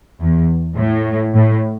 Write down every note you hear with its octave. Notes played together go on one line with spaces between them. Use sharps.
E2
A2
A2